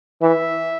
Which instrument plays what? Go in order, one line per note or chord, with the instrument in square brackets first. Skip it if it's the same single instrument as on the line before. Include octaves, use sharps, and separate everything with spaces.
[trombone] E3 [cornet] E5